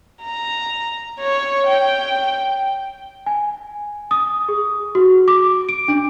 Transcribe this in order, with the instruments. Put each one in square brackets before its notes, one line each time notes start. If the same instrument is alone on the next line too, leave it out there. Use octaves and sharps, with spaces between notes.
[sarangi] A#5
C#5
G5
[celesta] G#5
D#6
G#4
F#4
D6
D7
D4